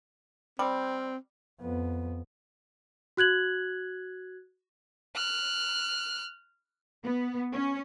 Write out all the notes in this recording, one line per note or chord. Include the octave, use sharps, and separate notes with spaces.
G3 C4
F2 B3
F#4 F#6 G#6 F#7
F6 F#6
B3
C#4